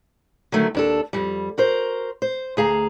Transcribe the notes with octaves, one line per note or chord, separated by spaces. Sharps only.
D3 D#3 F#3 A3
D#2 D4 A4
F2 G3
F#4 A#4 C5
C5
D2 G#4 F5 A#5